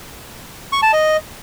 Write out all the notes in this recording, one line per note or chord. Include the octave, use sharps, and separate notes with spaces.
C#6
A5
D#5